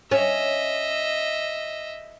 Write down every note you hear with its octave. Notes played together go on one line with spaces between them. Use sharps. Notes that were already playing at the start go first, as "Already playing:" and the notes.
C#4 D#5 E5